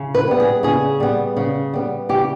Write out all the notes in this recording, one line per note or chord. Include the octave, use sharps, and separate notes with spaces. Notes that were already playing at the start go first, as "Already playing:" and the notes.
Already playing: C#3
B4
G3 B3
G#4
C#3 G#4
G3 B3
C#3
G3 B3
C#3 G4